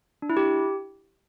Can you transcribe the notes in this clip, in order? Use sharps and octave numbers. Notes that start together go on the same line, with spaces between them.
D4
E4
G4